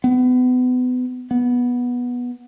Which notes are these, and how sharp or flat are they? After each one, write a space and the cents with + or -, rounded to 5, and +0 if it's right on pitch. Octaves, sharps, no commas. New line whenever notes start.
B3 +30
B3 -10